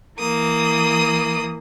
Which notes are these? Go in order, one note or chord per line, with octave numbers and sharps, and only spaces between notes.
E3 A#3 D#6